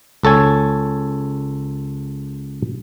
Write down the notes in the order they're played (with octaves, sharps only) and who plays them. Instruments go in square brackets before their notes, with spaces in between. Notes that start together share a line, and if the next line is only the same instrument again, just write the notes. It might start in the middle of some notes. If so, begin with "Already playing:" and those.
[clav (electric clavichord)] C#2 A4 C#5 G#5